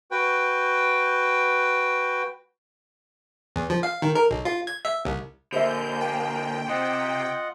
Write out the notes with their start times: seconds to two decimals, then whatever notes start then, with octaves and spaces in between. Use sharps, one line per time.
0.11 F#4 B4 G5
3.56 E2
3.70 F3
3.83 F5
4.02 D#3
4.15 A#4
4.31 B1
4.45 F4
4.67 G#6
4.85 E5
5.05 C2
5.52 D3 A#3 C5 E5 G6
6.00 G5
6.68 C3 F4 D#5 F#5